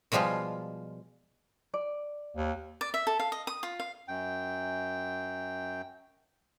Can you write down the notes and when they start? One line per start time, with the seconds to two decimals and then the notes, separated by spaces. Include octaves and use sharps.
0.12 B2 F3 G3 G#3 F4
1.74 D5
2.36 D#2
2.81 D5
2.94 E5
3.07 A4
3.20 F5
3.32 D#5
3.47 D#6
3.63 F4
3.80 F5
4.08 F#2 G5